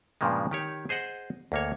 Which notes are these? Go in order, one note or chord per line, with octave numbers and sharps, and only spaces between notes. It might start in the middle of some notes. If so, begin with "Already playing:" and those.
G2 A#2 C#3 F3 G#3
D#3 G4 C#5
G#4 C5 D#5 F#5
D2 A#3 C#5